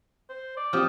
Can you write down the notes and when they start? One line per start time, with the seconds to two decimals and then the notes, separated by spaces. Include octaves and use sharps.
0.29 C5
0.57 D5
0.73 F3 C4 F#4 G4 D#6 F6